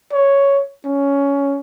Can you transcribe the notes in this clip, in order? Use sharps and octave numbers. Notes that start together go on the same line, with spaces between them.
C#5
C#4